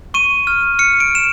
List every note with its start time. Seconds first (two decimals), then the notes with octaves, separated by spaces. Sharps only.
0.14 C#6 D#7
0.47 F6
0.79 F6 C#7
1.00 D7
1.11 F6 E7